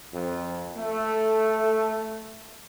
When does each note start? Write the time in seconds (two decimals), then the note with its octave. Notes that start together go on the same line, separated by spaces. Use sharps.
0.13 F2
0.76 A3